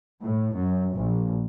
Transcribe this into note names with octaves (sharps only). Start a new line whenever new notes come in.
A2
F#2
A#1